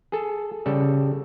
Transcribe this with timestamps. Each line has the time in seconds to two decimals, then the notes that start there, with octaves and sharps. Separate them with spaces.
0.12 G#4 A4
0.66 C#3 G3 A4